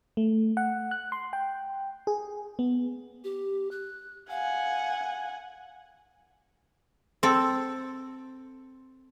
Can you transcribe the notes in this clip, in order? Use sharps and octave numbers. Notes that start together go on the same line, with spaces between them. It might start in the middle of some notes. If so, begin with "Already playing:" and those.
A3
F#5
F#6
C6
G5
G#4
B3
G4
F#6
F5 F#5 G#5
C4 A4